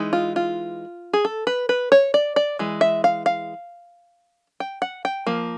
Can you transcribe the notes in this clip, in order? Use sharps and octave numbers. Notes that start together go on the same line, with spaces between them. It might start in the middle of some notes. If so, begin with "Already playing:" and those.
Already playing: E3 G#3 D#4
F4
F4
G#4
A4
B4
B4
C#5
D5
D5
E3 G#3
E5
F5
F5
G5
F#5
G5
F3 A#3